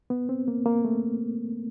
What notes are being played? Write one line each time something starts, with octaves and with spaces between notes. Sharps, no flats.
B3
C4
A#3
A#3
A3